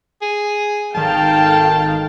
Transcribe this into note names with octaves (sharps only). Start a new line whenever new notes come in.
G#4
G#1 D#3 A4 F5 G5 A5